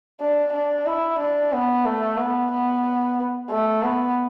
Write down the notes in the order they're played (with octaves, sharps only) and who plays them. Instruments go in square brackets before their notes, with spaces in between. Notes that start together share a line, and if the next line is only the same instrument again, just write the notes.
[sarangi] D4
D4
E4
D4
B3
A3
B3
B3
A3
B3